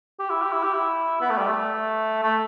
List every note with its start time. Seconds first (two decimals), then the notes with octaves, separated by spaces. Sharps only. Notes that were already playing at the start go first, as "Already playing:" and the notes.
0.19 G4
0.30 E4
0.42 G4
0.53 E4
0.63 G4
0.74 E4
1.21 B3
1.30 A3
1.38 G3
1.47 A3
2.23 A3